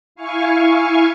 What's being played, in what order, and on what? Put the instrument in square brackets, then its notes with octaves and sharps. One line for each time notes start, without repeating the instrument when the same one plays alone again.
[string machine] E4 F5 G#5 C#6